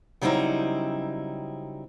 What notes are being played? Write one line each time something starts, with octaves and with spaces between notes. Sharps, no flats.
C#3 F#3 G3 C4 D#4 E4